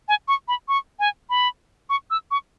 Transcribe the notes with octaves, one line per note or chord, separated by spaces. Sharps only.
G#5
C#6
B5
C#6
G#5
B5
C#6
E6
C#6